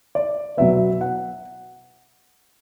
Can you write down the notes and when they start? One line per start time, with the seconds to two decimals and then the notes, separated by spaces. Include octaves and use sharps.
0.15 D5
0.57 B2 F#3 B3 E5
1.01 F#5